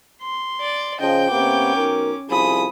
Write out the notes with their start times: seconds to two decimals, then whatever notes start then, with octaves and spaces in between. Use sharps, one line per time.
0.22 C6
0.61 D5
1.00 C#3 F3 D#5 G5
1.30 C3 A#3 B3 C#4 D6
1.75 B1 A#4
2.30 C2 F3 G#4 B5 D#6